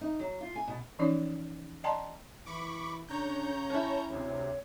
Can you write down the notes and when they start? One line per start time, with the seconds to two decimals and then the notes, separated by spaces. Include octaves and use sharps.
0.01 D#4
0.20 F#3
0.41 F4
0.56 G#5
0.67 B2
0.99 E3 F3 C#4 D#4 C#5 D5
1.84 D5 D#5 G5 A5 A#5 C6
2.46 E3 B5 C#6 D6
3.09 C#3 D4 C#5 A#5 G6
3.70 C#4 E4 A5
4.10 D2 C3 C#5